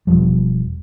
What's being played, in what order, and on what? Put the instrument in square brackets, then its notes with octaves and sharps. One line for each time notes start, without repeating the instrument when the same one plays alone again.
[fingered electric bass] E1 B1 F3 G3